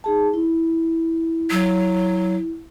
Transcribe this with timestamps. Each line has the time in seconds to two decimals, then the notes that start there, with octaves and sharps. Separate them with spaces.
0.04 D#4 G#4 A5
0.34 E4
1.51 F#3